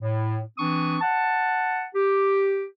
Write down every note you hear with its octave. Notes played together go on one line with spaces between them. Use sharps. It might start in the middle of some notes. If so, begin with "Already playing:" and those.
A2
E3 C4 D4 C#6 D#6
F#5 A5
G4